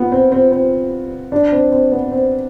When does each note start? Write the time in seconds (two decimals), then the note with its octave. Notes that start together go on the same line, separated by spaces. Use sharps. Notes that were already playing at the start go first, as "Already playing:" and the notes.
Already playing: B3 F4
0.12 C4
0.32 C4
0.52 C4
1.32 D4
1.52 C4
1.72 C4
1.92 B3
2.12 C4